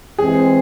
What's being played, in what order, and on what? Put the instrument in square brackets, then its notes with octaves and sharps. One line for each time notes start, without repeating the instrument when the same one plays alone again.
[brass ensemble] E3 G#3 C4 [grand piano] G#4